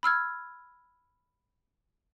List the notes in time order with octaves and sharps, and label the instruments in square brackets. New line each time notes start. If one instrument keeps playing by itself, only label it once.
[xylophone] B5 E6 F6 G#6